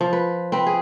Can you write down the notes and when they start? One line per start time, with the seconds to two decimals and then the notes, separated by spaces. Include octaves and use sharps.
0.01 F3
0.13 B4
0.52 C4 B4
0.67 G#4